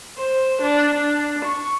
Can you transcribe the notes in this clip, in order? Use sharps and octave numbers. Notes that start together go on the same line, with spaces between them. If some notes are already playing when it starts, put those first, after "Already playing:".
C5
D4
D4
C#6